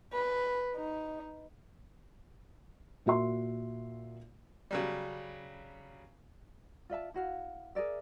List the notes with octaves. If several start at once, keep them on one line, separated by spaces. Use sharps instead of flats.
B4
D#4
A#2 F#4 E5 C6
C#3 F#3 G3
F4 D5 E5 A5
E4 F#4 F5
G#4 A#4 D5 E5